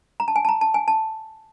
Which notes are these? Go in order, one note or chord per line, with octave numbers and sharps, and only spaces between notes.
A#5
A5
G#5
A5
A#5
A5
G#5
A5